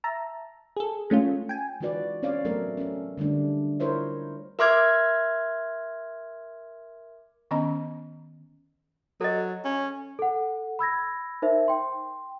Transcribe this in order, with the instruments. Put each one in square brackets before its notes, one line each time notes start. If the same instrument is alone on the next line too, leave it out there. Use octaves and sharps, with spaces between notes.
[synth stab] E5 A5 A#5
G#4 A4
G#3 A3 C#4 F4
G5 G#5
[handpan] E3 G#3 F4 F#4 B4 D5
C4 C#4 C#5 D5 F5
F#3 A3 B3 A4 A#4
C#4 A4
D3 G3 A3 D4
E4 F4 A#4 C5 C#5 E5
[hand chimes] A#4 E5 C6 D6 F6 G#6
[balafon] D#3 B3 C#4 D#5 A#5
[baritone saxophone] F#3 [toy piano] A4 D#5
[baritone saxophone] C#4
[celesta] A4 F#5
B5 E6 G#6 A#6
D#4 A#4 C5 E5
G5 C6